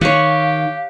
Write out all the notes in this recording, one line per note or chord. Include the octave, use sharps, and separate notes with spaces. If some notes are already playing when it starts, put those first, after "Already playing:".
D#3 G4 C#5 F5 F#5